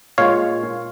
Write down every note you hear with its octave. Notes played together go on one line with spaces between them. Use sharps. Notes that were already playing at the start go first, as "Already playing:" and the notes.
A#2 G#3 F4 C#5 F5